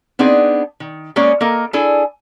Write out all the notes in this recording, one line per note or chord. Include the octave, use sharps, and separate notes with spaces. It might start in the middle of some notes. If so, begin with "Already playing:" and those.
B3 C4 D4 D#4 G#4
D#3
G#3 A#3 C#4 C#5 D5
A#3 A4 A#4 D#5
D4 E4 G#4 A4 G#5